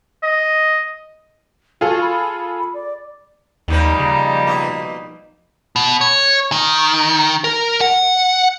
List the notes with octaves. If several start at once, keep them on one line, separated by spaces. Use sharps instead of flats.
D#5
F4 F#4 G#4 A4
B5
D5
D#2 D#3 F3 G3 A#3 D#4 B4
C#3
B2 D#4 E5
B2
C#5
D#3
A#4
F#5